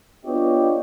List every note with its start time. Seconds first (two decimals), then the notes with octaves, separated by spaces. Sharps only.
0.24 B3 D4 F4 G4 C#5 D#5